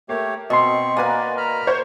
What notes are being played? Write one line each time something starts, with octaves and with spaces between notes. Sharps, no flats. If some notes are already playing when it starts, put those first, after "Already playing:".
A3 A#3 G4 C#5
B2 C4 D#5 C6 C#6
A#3 F#4 A#4 B4 D5 G#5
A#5 B5 F6
C5 C#5 C#6